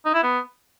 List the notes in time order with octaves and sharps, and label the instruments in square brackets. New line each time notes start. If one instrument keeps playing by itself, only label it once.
[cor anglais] D#4
E4
B3